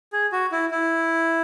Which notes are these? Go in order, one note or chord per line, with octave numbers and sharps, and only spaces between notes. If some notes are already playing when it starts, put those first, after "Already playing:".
G#4
F#4
E4
E4